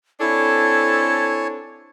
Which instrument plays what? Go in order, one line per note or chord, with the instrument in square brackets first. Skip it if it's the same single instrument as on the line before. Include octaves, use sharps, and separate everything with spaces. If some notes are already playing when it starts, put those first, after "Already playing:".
[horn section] C4 D4 A4 [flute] E4 [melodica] C#5 G#5 A5